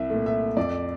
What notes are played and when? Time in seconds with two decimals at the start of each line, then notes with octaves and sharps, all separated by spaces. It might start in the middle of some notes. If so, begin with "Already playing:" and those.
Already playing: C2 E5
0.10 A#2 A3
0.26 E5
0.57 F2 D5